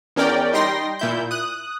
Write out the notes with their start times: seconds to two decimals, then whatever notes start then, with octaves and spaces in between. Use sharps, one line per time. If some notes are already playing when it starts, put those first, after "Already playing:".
0.16 E2 C#4 A#4 D5 G5
0.53 G3 D#4 G5 C6 A#6
0.99 A#2 E4 G6
1.31 D#6 F#6